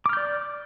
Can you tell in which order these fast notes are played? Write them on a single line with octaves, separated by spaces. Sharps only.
D6 F6 G6 D5